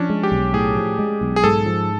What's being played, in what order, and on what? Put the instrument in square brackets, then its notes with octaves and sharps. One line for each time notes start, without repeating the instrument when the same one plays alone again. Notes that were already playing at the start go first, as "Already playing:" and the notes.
Already playing: [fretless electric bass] F3 [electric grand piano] C#4 D4
[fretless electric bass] G#3
[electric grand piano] G4
[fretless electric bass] B1
[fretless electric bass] A2 [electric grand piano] G#4
[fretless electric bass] F3
G#3
B1
[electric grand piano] G#4
[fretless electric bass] G#2 [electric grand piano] A4
[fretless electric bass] F3